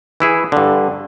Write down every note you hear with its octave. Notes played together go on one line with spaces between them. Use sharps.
E3 E4 G#4
G2 D3